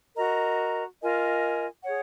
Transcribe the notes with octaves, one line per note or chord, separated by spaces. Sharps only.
F#4 A#4 D#5 A#5
F4 A#4 D#5 G#5
G#4 C#5 F#5